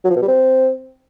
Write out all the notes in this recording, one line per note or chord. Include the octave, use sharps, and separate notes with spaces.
F#3
F3
B2
G3
C4